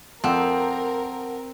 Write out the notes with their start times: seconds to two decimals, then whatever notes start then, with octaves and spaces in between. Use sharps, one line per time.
0.24 F2 C4 A#4 F#5 A5